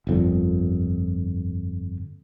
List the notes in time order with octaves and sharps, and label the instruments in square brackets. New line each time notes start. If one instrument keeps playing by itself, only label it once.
[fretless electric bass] G1 F2 A#2